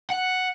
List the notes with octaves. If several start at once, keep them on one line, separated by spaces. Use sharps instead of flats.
F#5